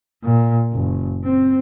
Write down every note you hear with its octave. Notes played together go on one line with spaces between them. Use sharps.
A#2
F#1
C4